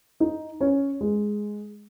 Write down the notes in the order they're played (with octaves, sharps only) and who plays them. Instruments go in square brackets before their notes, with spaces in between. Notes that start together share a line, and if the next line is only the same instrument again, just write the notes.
[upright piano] D#4
C#4
G#3